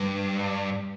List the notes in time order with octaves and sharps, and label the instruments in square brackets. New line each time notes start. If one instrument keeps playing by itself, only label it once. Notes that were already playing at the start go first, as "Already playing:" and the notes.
Already playing: [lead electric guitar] G2